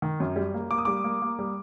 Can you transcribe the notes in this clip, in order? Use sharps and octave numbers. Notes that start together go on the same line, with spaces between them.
D#3
F#2
G3
A#3
A#3 D6
D#6
G3 D6
A#3
A#3
G3